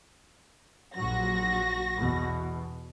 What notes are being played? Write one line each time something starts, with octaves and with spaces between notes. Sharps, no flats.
A#1 F#3 F#4 A#6
E2 B2